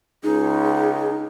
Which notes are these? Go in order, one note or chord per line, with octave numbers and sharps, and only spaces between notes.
C#2 D#4 G#4